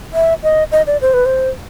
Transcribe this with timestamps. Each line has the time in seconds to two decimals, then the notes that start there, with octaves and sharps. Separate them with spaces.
0.13 E5
0.43 D#5
0.72 D#5
0.87 D5
1.01 C5
1.14 B4
1.26 C5